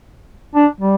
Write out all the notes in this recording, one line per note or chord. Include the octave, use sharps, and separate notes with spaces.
D4
G3